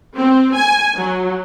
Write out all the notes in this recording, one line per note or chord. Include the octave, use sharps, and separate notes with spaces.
C4
G#5
F#3